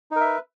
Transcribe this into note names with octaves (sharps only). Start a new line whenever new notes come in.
D#4 A#4 B4 E5